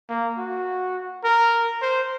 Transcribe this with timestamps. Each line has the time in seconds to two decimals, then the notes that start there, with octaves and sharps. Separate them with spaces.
0.09 A#3
0.38 F#4
1.24 A#4
1.81 C5